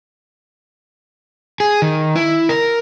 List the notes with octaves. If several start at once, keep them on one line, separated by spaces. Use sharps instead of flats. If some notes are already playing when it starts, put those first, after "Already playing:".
G#4
D#3
E4
A#4